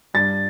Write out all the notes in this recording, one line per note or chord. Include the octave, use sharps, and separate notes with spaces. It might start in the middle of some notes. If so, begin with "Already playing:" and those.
G2 A6